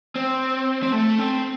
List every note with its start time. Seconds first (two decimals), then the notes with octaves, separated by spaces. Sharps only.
0.15 C4
0.83 C4
0.92 A3
1.18 C4